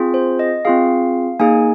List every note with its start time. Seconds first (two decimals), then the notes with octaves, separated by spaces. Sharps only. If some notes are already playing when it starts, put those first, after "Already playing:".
Already playing: C4 F4 G#4
0.14 C5
0.39 D#5
0.65 C4 F4 G#4 F5
1.40 A#3 D#4 G#4 G#5